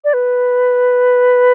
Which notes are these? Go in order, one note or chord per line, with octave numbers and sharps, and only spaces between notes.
D5
B4